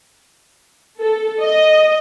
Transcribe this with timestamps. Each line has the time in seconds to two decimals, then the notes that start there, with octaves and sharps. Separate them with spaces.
1.01 A4
1.42 D#5